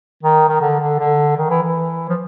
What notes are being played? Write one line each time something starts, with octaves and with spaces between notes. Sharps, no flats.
D#3
D#3
D3
D3
D3
D#3
E3
E3
F3